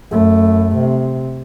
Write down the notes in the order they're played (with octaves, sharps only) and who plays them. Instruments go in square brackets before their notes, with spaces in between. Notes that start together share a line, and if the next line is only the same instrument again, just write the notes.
[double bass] F#2 A3
C3